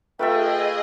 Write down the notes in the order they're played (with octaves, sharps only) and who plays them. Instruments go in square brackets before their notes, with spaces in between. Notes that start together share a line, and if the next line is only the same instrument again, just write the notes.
[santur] A3 F4 A4 [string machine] G#4 D#5 [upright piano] B4 E5 [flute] G5